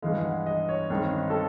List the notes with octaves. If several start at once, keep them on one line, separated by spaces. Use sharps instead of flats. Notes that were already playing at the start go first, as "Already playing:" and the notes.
G2 E3 G#3 F5
F#5
D#5
C#5
G2 D#3 G#3 C4
A4